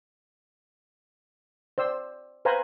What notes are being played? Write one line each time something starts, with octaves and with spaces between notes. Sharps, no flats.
C5 D5 E6
B4 C5 F5 G#5 A#5 B5